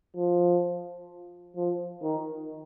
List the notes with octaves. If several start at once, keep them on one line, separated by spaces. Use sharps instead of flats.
F3
F3
D#3